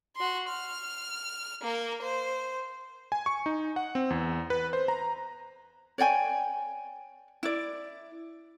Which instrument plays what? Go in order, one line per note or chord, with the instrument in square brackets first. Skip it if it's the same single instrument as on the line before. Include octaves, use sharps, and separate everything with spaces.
[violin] F#4 C6
F6
A#3 A#4
C5
[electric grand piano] G#5
C#6
D#4
F#5
C4
E2
B4
C5
A#5
[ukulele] C#5 D5 G5 G#5
E4 D5